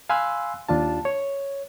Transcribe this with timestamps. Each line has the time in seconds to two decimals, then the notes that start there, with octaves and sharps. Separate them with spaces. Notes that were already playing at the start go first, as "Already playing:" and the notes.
0.09 F5 G#5 B5 C6 E6 F#6
0.69 D#2 D4 F4 A5
1.05 C#5